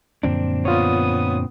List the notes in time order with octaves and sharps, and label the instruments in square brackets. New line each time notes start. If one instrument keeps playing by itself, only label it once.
[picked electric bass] F#2 D3 F3 [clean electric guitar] A#2 C4 D4
[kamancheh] B3 D#6 [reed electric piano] F4 C#5